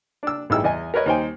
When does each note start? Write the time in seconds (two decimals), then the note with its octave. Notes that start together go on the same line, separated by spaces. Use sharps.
0.23 D4 E6
0.50 A1 G2 D#4 E4 G#4 E6
0.64 E2 D#5 G#5
0.94 A#4 B4 C#5 D#5
1.06 D#2 D#4 C5 G5 G#5